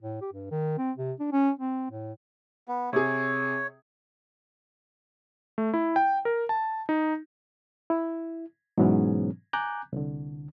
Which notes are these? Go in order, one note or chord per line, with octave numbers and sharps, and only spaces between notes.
A2
G4
G2
D#3
C4
C3
D4
C#4
C4
A2
B3
C3 G#4 C#5
A3
E4
G5
A#4
A5
D#4
E4
G#2 B2 E3 F#3 B3 C#4
G#5 A#5 D6 F#6 G6
C2 D3